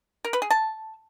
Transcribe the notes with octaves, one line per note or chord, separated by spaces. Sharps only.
A#4
B4
G#4
A5